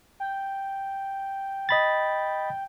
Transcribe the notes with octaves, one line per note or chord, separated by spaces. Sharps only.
G5
D#5 B5 A6